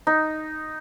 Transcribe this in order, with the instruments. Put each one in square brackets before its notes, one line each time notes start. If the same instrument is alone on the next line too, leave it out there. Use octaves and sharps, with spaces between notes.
[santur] D#4